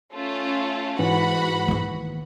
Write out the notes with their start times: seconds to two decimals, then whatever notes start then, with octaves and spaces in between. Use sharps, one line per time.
0.13 A3 C#4 F4
0.99 G#2 E3 F#4 F#5 B5
1.68 D#3 A#3